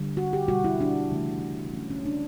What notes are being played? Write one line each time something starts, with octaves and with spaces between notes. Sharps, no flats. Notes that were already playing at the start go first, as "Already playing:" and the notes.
Already playing: D3 G3
F#4
G4
B2 G3 F#4
E4
D4
C#3 E3 A3
D3 F#3 A3 C#4
C#4
D4